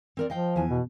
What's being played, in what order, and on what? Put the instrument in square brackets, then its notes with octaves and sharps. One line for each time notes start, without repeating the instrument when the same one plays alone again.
[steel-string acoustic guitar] C4 A#4 D5
[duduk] F3 [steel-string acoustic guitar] D#5 F5 G5
[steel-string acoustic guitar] E2 E3 G#5
[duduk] B2